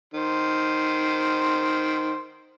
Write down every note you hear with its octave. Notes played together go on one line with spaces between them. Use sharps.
D#3 C5